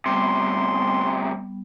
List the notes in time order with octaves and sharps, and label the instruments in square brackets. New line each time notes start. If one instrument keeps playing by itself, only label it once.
[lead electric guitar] D2 C3 [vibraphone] G3 B3 [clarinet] C6